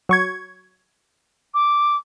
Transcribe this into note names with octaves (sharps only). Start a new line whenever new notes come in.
F#3 C#6 G#6
D6